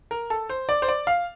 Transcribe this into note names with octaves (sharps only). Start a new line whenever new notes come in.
A#4
A4
C5
D5
C5
D5
F5